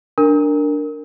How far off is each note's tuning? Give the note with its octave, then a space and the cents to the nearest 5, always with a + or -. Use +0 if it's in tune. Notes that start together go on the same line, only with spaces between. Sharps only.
D4 +0 A#4 -10